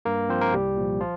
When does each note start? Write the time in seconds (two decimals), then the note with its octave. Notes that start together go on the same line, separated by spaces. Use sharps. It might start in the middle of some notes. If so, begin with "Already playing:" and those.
0.05 G2 A#3 A#4
0.29 F3 C4 C5
0.41 A#3 A#4
0.54 C2 G3 G4
0.77 A#2 F3
1.01 F3 F4